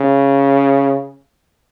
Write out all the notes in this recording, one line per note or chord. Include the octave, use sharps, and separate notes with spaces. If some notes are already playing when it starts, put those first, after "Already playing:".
Already playing: C#3